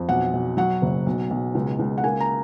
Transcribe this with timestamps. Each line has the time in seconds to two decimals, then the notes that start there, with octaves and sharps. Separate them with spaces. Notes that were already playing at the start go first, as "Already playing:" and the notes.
Already playing: F2
0.09 B1 F#5
0.33 B1
0.57 F#3 F#5
0.82 F#1
1.06 B1
1.31 B1
1.55 C#2
1.79 C#2
1.98 F#5
2.04 A#3 G#5
2.20 A#5